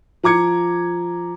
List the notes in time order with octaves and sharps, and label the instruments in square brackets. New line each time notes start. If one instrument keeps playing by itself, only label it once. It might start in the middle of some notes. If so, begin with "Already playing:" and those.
[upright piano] F3 A#5 D6 G#6 C#7